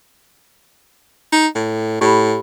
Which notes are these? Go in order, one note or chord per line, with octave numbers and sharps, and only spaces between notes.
D#4
A2
A2 G4 B5